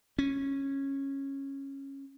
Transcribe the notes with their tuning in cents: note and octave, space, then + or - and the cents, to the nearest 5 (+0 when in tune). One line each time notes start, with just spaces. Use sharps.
C#4 -15